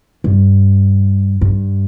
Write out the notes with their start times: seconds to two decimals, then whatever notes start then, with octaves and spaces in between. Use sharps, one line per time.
0.24 G2
1.41 G2